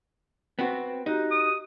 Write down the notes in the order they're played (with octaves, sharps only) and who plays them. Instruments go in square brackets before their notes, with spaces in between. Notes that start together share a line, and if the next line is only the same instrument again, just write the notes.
[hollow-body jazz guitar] B3 C4 F#4
[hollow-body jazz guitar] D#4 [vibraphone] F#4 G4
[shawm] D#6